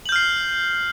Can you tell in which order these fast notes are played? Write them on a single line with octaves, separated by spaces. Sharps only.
F#7 G6 F6 C7